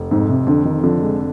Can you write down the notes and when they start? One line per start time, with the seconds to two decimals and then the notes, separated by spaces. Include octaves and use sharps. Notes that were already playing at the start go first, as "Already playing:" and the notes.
Already playing: F1
0.11 F2 G#2
0.29 C3
0.47 F2 D3
0.65 D#3
0.83 D3 F3
1.02 G#3